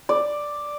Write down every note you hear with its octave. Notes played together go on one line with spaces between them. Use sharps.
D5